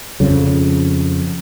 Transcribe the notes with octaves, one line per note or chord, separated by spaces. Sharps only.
F2 C#3